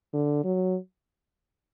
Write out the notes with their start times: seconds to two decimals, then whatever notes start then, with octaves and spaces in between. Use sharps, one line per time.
0.14 D3
0.44 F#3